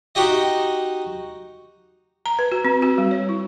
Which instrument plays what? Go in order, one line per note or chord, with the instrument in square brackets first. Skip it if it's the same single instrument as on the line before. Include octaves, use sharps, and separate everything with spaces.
[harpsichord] D#4 F#4 G4 D#5
[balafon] A#5
B4
F#4
C4
F#4
G3
C#5
E4